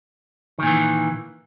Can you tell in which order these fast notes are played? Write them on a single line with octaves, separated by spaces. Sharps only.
D#3 A#2 E3